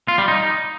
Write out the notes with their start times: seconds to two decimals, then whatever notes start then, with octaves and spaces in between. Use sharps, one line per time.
0.08 F4
0.18 G3
0.28 D#4